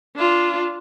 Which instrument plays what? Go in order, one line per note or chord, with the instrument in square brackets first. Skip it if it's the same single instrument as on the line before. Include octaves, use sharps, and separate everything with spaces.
[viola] D4 F4